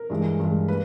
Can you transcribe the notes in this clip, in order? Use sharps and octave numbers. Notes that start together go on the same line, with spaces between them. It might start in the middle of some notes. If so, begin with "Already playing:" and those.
Already playing: A#4
G2 E3 G#3
G2 E3 G#3
A#3 B4